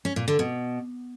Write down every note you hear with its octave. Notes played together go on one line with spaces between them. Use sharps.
C#4
A#2
D3
B2